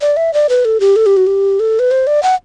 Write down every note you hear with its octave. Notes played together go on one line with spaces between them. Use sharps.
D5
E5
D5
B4
A4
G4
A4
G4
F#4
G4
A4
B4
C5
D5
F#5